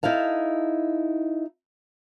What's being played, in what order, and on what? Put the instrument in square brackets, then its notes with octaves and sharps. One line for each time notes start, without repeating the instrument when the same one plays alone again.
[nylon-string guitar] D#4 E4 A4 F5 A5